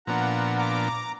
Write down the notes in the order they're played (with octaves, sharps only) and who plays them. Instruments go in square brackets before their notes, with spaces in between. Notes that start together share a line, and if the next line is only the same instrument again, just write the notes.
[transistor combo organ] A#2 F3 B3 D4 [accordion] F#5 A#5
[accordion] A#5 D6